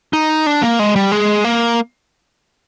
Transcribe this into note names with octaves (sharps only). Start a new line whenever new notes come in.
D#4
D4
A#3
G#3
G3
G#3
A#3